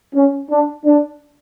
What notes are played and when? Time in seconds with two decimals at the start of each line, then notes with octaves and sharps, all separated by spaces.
0.15 C#4
0.49 D4
0.85 D4